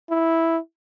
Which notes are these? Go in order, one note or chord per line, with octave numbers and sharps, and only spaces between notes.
E4